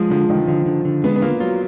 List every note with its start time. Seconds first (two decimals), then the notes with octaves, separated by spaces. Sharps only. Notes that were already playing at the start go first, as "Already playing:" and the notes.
Already playing: F3 G#3
0.10 D3 F3
0.29 D3 D#3
0.47 D3 F3
0.66 D3
0.85 D3
1.04 G#3 B3
1.16 B3
1.22 A#3 F4
1.40 F#3 F4